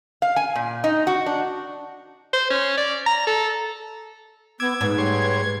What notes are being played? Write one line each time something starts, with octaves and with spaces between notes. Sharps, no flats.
F5
G#5
A#2
D#4
F#4
D4
C5
C#4
D5
A#5
A4
B3 D6 E6 G#6
G#2 B4
G3 C#5 C6